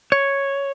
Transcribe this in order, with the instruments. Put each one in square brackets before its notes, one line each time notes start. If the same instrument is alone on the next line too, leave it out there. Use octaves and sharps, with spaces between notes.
[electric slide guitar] C#5